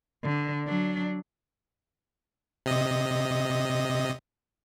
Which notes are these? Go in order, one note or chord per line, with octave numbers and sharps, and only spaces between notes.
D3
F#3 D4
C3 D#5